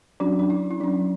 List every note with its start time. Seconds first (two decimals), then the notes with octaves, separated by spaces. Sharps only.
0.20 F#3 C#4 D4 F#4
0.39 D4
0.50 E4
0.71 E4
0.80 F#3 C#4 D4